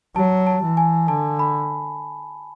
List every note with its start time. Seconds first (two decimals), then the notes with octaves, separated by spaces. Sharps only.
0.16 F#3 A5
0.47 A5
0.63 E3
0.77 G#5
1.08 D3 A5
1.39 B5